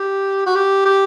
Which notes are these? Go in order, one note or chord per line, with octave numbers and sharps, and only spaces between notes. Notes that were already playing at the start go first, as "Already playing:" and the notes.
Already playing: G4
F#4
G4
G4